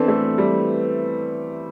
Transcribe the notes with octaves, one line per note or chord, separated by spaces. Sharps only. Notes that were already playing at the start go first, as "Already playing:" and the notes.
Already playing: E3 B3 C4 D4 A4
A3
G3